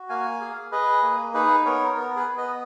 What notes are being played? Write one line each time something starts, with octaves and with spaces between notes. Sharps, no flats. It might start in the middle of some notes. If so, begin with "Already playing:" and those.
Already playing: F#4
A#3 F5 G#5
G#4
G#4 B4 D#5
A#3
D#4 G#4 B4
B3 A#4 C#5
B3 A#4
G#4 B4
B3
B4 D#5